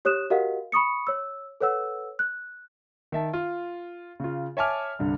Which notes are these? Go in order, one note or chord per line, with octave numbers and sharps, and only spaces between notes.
G4 C#5 D#6 F#6 E7
F#4 G4 A#4 D#5 F5 F#5
B5 C#6 D#6 C#7
C#5 E6
A4 B4 C#5 F#5 E6
F#6
D#3 E5 A5
F4
C#3 F4
C#5 E5 G#5 A5 D6 F6
C2 G2 D3